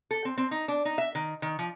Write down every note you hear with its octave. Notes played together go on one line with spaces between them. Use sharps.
A4
C4
C4
D#4
D4
D#4
E5
D#3
D#3
F3